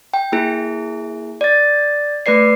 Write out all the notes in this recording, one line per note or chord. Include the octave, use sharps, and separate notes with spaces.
G5
A#3 E4 G#4
D5 A6
A3 B4 D5 C7